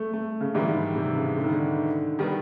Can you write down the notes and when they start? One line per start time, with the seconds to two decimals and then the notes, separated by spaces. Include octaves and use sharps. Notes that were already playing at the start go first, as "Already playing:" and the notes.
Already playing: A3
0.14 A3
0.41 C#3
0.54 G#2 D3 E3 G3 B3
0.68 D#3
0.95 C3
1.16 C#3
1.37 D3
1.44 D#3
1.53 D3
2.19 D#3 G3 B3